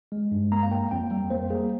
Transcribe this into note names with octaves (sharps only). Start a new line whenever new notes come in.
G#3
G2
A#3 A#5
F5
A#3 G5
F2 G5
G3
A#3 C5
A#3 G#4